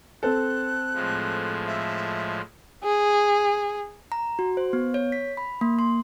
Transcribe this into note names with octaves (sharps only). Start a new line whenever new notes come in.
C4 A4 F#6
A2 F3 G#3
E5
G#4
A#5
F#4
C5
B3
C#5
B6
B5
A#3
C6